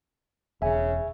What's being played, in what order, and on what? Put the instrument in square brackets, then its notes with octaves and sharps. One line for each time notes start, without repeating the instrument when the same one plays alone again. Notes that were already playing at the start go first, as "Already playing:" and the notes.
[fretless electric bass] E1 [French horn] C#3 [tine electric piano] E5 G#5